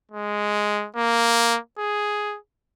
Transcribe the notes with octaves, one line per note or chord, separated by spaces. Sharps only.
G#3
A#3
G#4